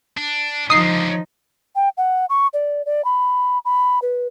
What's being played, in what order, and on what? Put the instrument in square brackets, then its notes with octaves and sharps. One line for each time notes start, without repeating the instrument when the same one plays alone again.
[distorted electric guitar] D4
[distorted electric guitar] C#2 D3 [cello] F3 D#4 [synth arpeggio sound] D#6 C7
[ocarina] G5
F#5
C#6
D5
D5
B5
B5
B4